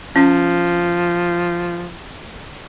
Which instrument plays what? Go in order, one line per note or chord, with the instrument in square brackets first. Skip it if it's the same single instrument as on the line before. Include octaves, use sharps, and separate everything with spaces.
[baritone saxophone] F3 [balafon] C#4